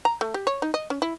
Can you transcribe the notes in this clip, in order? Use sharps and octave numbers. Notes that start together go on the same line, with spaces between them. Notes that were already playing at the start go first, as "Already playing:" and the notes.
A#5
A3
G4
C#5
D#4
D#5
C#4
E4